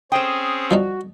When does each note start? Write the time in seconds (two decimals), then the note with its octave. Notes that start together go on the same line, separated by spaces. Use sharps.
0.12 C4 C#4 G#4 C5 G5 D#6
0.71 F3 G3 D#4 F#4